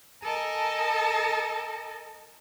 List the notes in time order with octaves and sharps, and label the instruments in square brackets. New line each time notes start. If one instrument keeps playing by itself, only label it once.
[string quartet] A4 A#4 D#5 G#5 A5